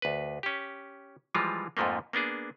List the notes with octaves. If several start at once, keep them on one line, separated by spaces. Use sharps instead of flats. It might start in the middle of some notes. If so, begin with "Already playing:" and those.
D2 B4
C#4 G4
E3 F3 G3 G#3 F4
F2 G#2 F3 A3 A#3
A#3 B3 D4 G#4